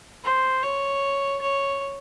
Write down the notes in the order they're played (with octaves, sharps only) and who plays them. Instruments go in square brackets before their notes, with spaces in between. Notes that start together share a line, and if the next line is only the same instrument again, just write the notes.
[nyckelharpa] C5
C#5
C#5